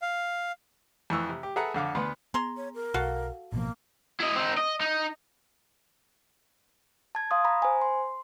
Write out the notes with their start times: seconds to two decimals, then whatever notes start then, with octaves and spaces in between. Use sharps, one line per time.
0.02 F5
1.10 F2 E3 C#6 E6
1.29 C3
1.43 G4
1.56 G#4 A4 B4 E5 F#5 A#5
1.74 F2 D3 F5 D6
1.95 D2 B3 B4 C6
2.34 B3 G#4 A#5 C6
2.57 C#5
2.75 A#4
2.94 B1 F#4 A4 F5
3.52 A1 B2 F3 A#3
4.20 E4 D#5
4.36 C4 D#4
4.57 D#5
4.80 D#4
7.15 A5 G#6
7.31 F5 C6 D#6
7.45 A#5 B5
7.62 C5 G#5
7.82 C6